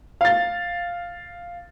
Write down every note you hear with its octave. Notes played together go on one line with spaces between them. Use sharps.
F5 A6